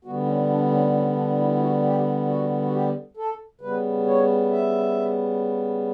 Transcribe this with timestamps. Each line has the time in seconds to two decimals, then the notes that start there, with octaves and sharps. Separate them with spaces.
0.05 D3 G3 B3 F#4
0.27 C#4
0.50 D4
0.71 C#4
0.94 C#4
1.16 D4
1.39 E4
1.54 E4
1.60 F#4
1.83 G4
2.27 F#4
2.62 F#4
2.72 G4
3.17 A4
3.61 C#3 G3 B3 B4
4.06 C#5
4.51 E5